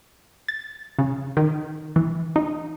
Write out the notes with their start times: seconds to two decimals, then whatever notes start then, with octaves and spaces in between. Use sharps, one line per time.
0.48 A6
0.99 C#3
1.37 D#3
1.96 E3
2.36 D#4